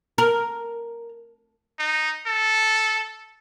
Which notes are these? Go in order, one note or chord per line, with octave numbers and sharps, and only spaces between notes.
A#4
D#4
A4